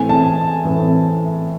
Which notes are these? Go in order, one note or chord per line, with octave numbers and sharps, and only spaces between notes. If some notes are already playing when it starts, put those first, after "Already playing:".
Already playing: A2 E3 A3 C4 G#5
A5
A2 E3 A3 C4